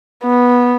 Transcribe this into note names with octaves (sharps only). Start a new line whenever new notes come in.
B3